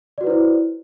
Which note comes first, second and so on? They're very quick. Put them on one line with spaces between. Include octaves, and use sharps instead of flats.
D5 F#4 B4 E4 C5